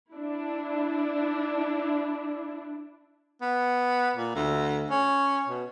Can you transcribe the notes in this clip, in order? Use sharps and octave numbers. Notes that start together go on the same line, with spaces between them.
D4 E4
B3
A#2
D2
C#4
B2